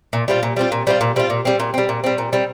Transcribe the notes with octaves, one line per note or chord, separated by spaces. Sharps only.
A#2
G3 C4 F4
A#2
G3 C4 F4
A#2
G3 C4 F4
A#2
G3 C4 F4
A#2
G3 C4
A#2
G3 C4
A#2
G3 C4
A#2
G3 C4